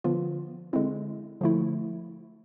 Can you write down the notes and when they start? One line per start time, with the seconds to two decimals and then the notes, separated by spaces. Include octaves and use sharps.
0.04 D3 F3 B3 F4
0.73 D3 G#3 C4 E4
1.41 D3 F3 A3 E4